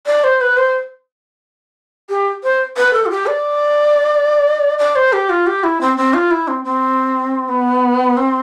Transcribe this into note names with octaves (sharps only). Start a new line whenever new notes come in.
D5
C5
B4
C5
G4
C5
B4
A4
F4
G4
D5
D5
C5
G4
F4
G4
E4
C4
C4
F4
E4
C4
C4
B3
C4